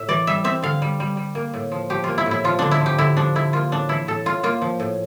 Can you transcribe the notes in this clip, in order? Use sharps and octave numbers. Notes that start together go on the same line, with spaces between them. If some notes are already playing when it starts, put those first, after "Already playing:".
Already playing: A2 E5
E3 D5
G3 E5
C4 E5
D3 F5
G3
G3
G3
A#3
A2
F3
F3 G4
A#3 F4
E4
A2
E4
F3 F4
D3 D4
E4
F3 G4
D3 E4
F3 D4
D3 E4
A#3 F4
A2 D4
E3 E4
A2 A4
A2 F4
A#3 F4
F3
A2